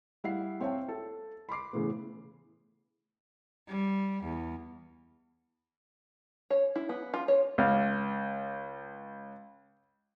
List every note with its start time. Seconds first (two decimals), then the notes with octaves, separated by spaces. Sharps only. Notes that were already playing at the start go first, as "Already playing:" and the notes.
0.24 G3 E4 F5 F#5 C7
0.60 C4 C#5 E5 F5 G5 A5
0.89 A4
1.49 B5 C6 D6 C7
1.73 A2 C#3 E3 A3 B3
3.67 G3
4.23 E2
6.50 C#5
6.76 E4
6.89 B3
7.14 F4
7.28 C#5
7.58 C#2 F5